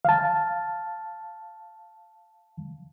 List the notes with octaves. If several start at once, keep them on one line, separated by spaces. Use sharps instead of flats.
F5 A5